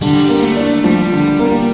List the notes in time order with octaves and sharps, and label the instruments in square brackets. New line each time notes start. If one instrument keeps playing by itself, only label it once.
[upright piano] D3 [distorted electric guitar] G3
[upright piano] A#3
[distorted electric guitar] A3
[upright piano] D4
[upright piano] F3 [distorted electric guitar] G3
[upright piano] D3
A#3